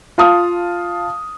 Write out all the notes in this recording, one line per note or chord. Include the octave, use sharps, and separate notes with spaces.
F4 F5 A5 D#6 F6